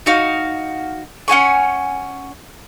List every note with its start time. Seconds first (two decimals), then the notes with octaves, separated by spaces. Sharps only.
0.06 D#4 F#4 F5
1.28 C#4 F#5 G#5 C#6